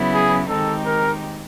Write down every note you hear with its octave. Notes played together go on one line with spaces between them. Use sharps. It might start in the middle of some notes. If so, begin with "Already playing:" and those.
Already playing: C#3 F#3 B3 E4
G#4
D#3 G#3 C4 D#4 G4 A4
A#4